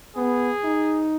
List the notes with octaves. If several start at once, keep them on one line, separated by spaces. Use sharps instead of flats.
B3 G#4
D#4